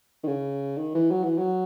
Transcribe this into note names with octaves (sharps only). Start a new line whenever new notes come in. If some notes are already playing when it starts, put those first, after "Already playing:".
D#3
C#3
D#3
E3
F#3
E3
F#3